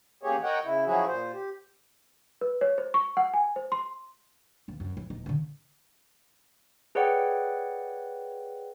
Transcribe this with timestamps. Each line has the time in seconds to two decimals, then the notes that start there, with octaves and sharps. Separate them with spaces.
0.23 E2 C#3 A#3 G4 G#4 C#5
0.43 A#4 C#5 D#5 F#5 G5
0.64 C#3 E4
0.86 F3 F#3 C#4 E4 F#4 G#4
1.06 A#2 C5
1.33 G4
2.41 B4
2.61 C#5
2.78 C5
2.94 C#6
3.17 F#5
3.34 G#5
3.56 C5
3.72 C6
4.68 F1 D#2
4.80 F#2 C3
4.97 F#3 E4
5.10 D#1 D#4
5.26 A1 D3
6.95 G#4 B4 C#5 D5 F#5 G5